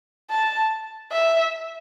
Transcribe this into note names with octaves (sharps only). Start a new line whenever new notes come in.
A5
E5